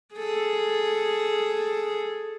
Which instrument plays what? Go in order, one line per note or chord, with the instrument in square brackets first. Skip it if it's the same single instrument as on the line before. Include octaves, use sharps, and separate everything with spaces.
[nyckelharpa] G#4 A4